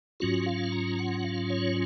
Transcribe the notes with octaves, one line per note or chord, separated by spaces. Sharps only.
G#2 F#3 C#4 F4 F#4
F5
A#5
F#5
F5
C#5